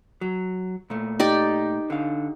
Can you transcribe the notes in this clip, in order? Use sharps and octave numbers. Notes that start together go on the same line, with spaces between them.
F#3
A#2 A3
D#4 G4 D5
D3 F5